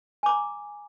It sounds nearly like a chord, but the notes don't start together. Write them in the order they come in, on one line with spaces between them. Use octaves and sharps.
G#5 D6 A#5